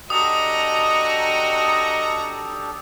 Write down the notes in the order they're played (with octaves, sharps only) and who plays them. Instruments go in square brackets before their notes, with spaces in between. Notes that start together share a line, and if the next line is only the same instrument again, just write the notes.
[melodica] D4 G4 A4 [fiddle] F#4 A#5 [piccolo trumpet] D#5 [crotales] D#6